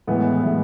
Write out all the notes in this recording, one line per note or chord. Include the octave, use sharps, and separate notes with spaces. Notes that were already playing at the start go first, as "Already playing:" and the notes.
A2 E3 G#3 B3
A2 E3 G#3